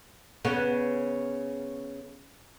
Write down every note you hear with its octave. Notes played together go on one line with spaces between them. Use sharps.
C#3 B3